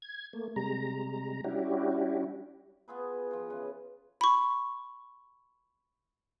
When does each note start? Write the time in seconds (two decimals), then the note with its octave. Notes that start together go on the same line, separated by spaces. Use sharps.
0.02 G#6
0.33 A3 A#3
0.56 C3 G3 G#3 A#5
1.44 G3 C#4 D4 E4 F#4 G4
2.88 B3 F4 G#4 B4
3.31 F3 F4
3.50 C#3 E3 B4
4.21 B5 C#6